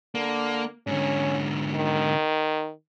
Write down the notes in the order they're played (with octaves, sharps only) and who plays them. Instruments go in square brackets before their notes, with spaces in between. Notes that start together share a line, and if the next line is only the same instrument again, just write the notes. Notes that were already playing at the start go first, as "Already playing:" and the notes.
[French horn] D3 [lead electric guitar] A#3
[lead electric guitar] G#2 D3 [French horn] C#4
[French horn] D#3